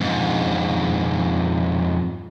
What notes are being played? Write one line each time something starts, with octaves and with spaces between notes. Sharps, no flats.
F2 G#2